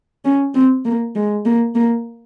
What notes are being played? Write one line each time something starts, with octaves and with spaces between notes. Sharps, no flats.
C#4
C4
A#3
G#3
A#3
A#3